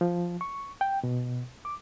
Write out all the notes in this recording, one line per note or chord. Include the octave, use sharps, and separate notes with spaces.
F3
C#6
G5
B2
D6